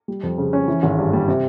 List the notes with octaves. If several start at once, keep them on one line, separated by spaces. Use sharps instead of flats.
G3
F2
C#3
C#4
E3
G#1
G2
G3
C3